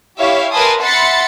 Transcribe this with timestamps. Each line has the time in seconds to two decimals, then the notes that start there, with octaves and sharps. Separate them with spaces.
0.19 E4 G4 C#5 E5 F5
0.52 A#4 B4 G#5 A5 C6 D#6
0.83 E5 F#5 B5 C6 A6 C#7